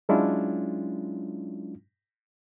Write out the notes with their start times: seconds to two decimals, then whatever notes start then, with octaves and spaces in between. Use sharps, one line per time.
0.09 F#3 G#3 C#4 D4 E4 F4